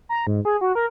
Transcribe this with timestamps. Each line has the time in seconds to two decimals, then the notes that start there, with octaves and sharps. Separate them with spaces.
0.09 A#5
0.27 G#2
0.45 G#4
0.61 F#4
0.75 A#4